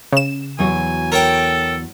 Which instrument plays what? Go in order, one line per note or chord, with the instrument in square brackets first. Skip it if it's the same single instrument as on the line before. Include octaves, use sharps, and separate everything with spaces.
[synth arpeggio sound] C#3 E7
[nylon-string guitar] E2 F#3 F#4 [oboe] G#5
[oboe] A4 [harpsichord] A#4 C#5 G5